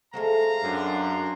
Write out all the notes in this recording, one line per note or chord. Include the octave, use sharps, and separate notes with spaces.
G#3 A3 C4 F5 A#5
F#2 D4 C6